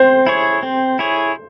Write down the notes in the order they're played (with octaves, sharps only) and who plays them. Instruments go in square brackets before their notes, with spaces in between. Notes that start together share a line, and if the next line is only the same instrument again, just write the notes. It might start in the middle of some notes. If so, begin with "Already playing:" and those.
Already playing: [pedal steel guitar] C4 [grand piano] C5
[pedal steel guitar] E4 G#4 C#5
C4
E4 G#4 C#5